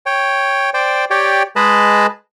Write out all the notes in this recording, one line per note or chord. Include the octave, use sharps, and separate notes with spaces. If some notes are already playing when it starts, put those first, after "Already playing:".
C#5 G5
C5 D5 G5
G4 C#5 D5 G5
G#3 G#4 B4 D#5 A5 B5